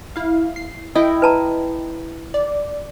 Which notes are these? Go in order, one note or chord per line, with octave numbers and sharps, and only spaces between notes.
E4 F5
C7
E4 A4 D#5 G5
B4 A5 A#5
D5